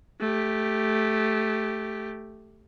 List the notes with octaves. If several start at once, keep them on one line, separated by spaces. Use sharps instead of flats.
A3 G4